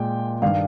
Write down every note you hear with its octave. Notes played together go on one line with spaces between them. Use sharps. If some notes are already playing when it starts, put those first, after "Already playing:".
Already playing: A#2 G#3 G5
G2 D#3 G3 F5